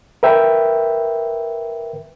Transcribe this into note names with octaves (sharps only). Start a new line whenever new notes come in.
A#4 B4 E5 G5